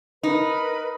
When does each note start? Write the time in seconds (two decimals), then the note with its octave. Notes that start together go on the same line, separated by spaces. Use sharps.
0.23 D#4 A#4 B4 B5